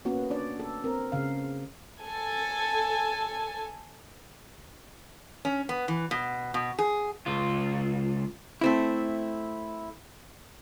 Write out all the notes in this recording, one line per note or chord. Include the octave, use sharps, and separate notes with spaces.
A#3 B3 C#4 F#4
D4 C#5 D5
A4
C4 A#4
C#3 F5
A4 G#5
C#4
B3
E3
B2
B2
G#4
C#2 F4
A3 C4 E4